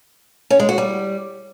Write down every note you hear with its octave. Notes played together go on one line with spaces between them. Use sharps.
C#4
G#3
F#4
G3